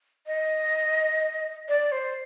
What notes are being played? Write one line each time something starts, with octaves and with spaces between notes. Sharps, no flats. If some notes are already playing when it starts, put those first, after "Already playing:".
D#5
D5
C5